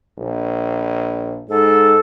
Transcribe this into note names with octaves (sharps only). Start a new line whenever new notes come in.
A#1
G#2 A4